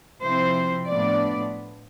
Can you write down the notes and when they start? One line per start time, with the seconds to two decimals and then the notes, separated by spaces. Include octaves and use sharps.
0.22 C3 F3 C4 E4 C5
0.88 A2 F3 B3 D4 D5